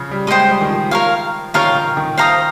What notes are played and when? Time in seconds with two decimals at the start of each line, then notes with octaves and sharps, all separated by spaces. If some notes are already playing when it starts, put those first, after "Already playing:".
Already playing: C#3 F3
0.11 G3
0.27 G#3 C5 G5 C6 D#6
0.49 G3
0.61 D#3
0.70 F3
0.91 A#4 C#5 F5
1.54 D#3 F4 A#4 C#5 F5
1.75 D#3
1.97 D#3
2.18 C5 F5 A#5 D#6